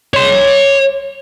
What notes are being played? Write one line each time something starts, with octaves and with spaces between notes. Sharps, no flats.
C#5 C6